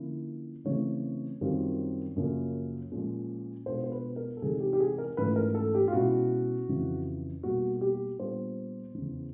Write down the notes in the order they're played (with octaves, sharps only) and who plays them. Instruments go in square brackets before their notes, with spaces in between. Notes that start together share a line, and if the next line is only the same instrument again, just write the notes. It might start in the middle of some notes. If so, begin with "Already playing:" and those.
Already playing: [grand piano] D3 F3 A#3 C#4 E4
C#3 E3 A3 C4 C#5
F#2 D#3 G3 C4 F4
F#2 C#3 F3 A#3 C#4
A#2 F3 G#3 C#4
B2 G#3 B3 D4 F4 C5
C5
B4
A#4
A4
C3 E3 G#3 C4 D#4 G#4
G4
G4
G#4
A#4
G#2 E3 A3 C#4 F4 B4
A#4
A4
G4
F4
B2 G#3 C#4 E4 F#4
F2 C#3 E3
B2 G3 A#3 F#4
F#4
G4
A#2 G3 B3 D4 F4 C5
E2 C#3 E3